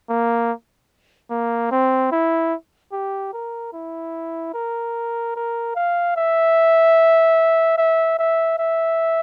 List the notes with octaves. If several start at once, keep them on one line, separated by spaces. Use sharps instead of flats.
A#3
A#3
C4
E4
G4
A#4
E4
A#4
A#4
F5
E5
E5
E5
E5